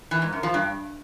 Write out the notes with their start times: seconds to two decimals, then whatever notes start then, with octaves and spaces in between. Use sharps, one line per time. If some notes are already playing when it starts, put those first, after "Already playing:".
0.11 E3
0.22 G#2
0.33 F#2
0.43 F3
0.54 G2